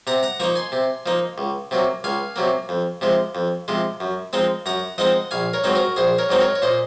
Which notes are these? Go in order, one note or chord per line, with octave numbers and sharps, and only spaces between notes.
C3 F#5 A#5
F#5 A#5
F3 A#3 D#4 A#5 C#6
G#5 C6
C3
F3 A#3 D#4
C#2
C3 F#3 A#3
C#2 F5 G#5
C3 F#3 A#3
F2
C3 F3 G#3
F2
C3 F3 G#3
F#2
F3 G#3 C4 D#4
F#2 F#5 A#5
F3 G#3 C4 D#4 D#5 F#5
A#1 F5 G#5
A#4 C#5
G#2 F#3 C4 D#4
F#4 A#4
A#1 G#4 C5
A#4 C#5
G#2 F#3 C4 D#4
A#4 C#5
C#5
A#2 C5 D#5